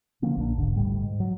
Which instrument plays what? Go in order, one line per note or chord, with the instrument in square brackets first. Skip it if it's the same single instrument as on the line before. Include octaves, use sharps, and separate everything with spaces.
[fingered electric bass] D3 F3 A#3 C4
A#1 A#3 D4
E1 G#2 D3
G#1 D2 A2 G3
G#2
F#3